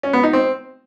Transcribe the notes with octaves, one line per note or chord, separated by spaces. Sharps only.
C#4
B3
D#4
C4